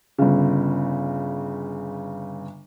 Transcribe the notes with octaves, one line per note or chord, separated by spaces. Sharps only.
G1 C#3